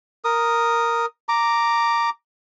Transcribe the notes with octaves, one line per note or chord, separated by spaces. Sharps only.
A#4 D#6
A#5 D6